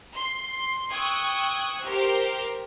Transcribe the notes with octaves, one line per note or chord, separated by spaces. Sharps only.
C6
G5 C#6 D#6 E6 F#6 G#6
G4 A#4 C5